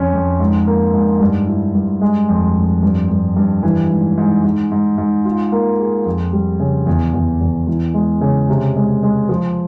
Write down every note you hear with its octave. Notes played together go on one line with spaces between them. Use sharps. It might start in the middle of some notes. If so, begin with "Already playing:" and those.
Already playing: F2 C#4
F2
G#2
A#3
G#2
G2
E4
G2
G#3
F2
F2
G2
G2
G2
E3
G#2
G#2
G#2
G#2
G#2
F4
A#3
G#4
F2
G3
C#3
E2
E2
E2
E3
G#3
C#3
C3
G#3
G#3
F3